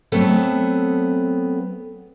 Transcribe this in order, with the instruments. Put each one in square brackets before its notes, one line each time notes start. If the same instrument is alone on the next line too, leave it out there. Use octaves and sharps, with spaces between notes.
[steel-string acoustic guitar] F#3 A3 B3 C4 A4 E5